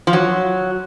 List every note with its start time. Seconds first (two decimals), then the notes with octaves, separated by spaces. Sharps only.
0.07 F3
0.13 F#3